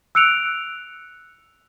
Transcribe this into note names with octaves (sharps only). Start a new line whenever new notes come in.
E6 F#6 C#7 D7 F7